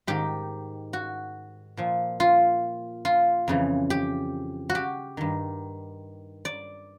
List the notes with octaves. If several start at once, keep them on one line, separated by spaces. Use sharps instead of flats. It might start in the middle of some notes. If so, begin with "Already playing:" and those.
G#2 D#3 G4
F#4
A#2 F3
F4
F4
F2 C#3 E3
G4
F#4
G4
G2 D#3
D5